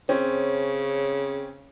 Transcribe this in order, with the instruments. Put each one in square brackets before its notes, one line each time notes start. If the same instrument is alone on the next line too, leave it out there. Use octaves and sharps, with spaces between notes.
[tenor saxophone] C#3 [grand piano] C4 C#4